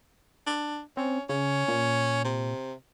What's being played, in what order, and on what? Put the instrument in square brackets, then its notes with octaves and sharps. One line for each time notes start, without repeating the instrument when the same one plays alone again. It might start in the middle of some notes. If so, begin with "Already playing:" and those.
[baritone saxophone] D4
[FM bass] C4 [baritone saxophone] C#4
[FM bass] C#3 [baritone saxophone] C#4
[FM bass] A#2
[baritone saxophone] C3